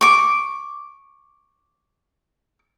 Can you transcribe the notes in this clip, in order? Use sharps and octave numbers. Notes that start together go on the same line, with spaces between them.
C#6 D6